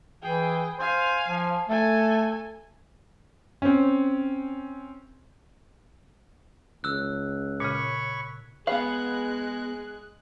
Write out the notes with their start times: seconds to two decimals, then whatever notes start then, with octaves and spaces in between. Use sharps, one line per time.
0.22 E3 G#4 G5
0.79 C5 F5 G#5
1.28 F3
1.69 A3 A4 G#5
3.62 C4 C#4
6.84 C#2 E6 F#6
7.60 A#2 C#3 C#5 B5 C#6
8.67 G#3 B3 G#4 B4 F5 F#6